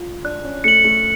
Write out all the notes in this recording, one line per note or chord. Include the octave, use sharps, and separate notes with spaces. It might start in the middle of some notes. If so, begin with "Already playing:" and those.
Already playing: F4
D4 F#6
C#4
A3 C#7 F#7
A3